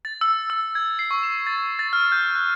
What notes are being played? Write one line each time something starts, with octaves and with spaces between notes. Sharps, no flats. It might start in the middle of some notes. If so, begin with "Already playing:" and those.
A6
E6
E6
G#6
C7
C#6
E7
A6
A6
F6
G6
F#6